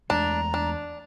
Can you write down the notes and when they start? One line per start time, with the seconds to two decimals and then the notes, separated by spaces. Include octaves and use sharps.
0.10 E2 G#3 A3 D4 A#5
0.54 D4